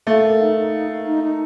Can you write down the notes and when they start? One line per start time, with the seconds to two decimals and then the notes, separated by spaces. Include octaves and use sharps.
0.06 A3 F5
0.22 A#4
0.39 D#4
0.55 D#4
0.72 F5
0.88 A#4
1.05 D#4
1.21 D#4